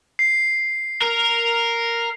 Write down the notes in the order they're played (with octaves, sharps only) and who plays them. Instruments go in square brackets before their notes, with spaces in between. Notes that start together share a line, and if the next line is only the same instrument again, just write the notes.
[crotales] C7
[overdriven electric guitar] A#4